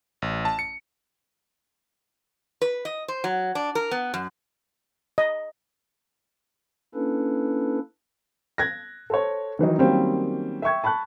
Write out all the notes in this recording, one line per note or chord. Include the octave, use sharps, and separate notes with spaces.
A1
A5
C#7
B4
D#5
C5
F#3
D4
A#4
B3
F#2
D#5
A#3 C#4 D4 E4 A4 B4
F#6 G#6 A#6
A4 C5 C#5
D#3 E3 F#3 D#4
D#3 F#3 G3 A#3 C4 C#4
E5 G5 C#6 G#6
A5 B5 C#6 F#6